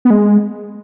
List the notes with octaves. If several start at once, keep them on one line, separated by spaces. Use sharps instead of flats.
B3
G#3